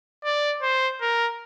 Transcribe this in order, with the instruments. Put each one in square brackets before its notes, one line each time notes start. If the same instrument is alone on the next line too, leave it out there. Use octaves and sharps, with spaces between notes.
[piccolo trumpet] D5
C5
A#4